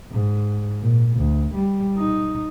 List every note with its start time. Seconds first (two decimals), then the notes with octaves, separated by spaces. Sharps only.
0.11 G#2
0.82 A#2
1.17 D2
1.55 G3
1.98 D#4